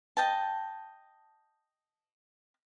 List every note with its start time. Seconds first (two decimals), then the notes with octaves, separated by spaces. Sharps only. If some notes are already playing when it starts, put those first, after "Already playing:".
0.17 D#5 G5 A5